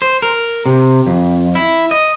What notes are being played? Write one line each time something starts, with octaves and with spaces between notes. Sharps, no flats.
C5
A#4
C3
F2
E4
D#5